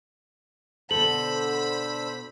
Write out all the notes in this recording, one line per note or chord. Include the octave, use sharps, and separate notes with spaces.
B2 D3 A4 C5 B5 E6 F#7